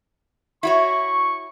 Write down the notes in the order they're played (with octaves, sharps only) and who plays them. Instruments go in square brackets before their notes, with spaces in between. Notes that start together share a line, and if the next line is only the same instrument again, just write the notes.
[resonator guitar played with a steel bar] E4 F#4 C#5 [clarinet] C#6